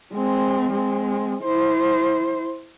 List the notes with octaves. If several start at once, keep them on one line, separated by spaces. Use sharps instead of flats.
G#3 C4
G#3 C4
E4 C5